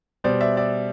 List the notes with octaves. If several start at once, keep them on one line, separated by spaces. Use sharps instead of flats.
B2 G3 C5 D5
D5 E5
D5 E5